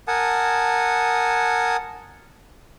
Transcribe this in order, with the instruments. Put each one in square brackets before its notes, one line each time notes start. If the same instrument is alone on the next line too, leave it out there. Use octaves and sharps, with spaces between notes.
[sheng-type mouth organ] A#4 F#5 G#5 A5 D#6